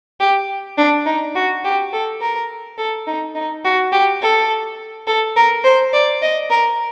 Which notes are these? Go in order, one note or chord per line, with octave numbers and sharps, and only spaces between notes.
G4
D4
D#4
F#4
G4
A4
A#4
A4
D#4
D#4
F#4
G4
A4
A4
A#4
C5
D5
D#5
A#4